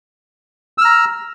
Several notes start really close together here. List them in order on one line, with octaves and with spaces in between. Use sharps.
E6 F6 A#5